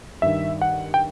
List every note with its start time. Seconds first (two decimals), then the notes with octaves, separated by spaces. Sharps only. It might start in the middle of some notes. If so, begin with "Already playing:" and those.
0.22 G2 D#3 E5
0.61 F#5
0.94 G5